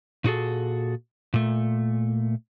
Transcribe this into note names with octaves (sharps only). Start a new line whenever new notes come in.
A#2 D#4 F#4 G#4 A4
A#2 A3